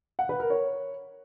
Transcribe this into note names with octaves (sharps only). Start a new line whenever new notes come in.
F#5
B4
A#4
C#5